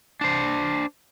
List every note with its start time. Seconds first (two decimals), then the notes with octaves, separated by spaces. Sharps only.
0.21 D4 C5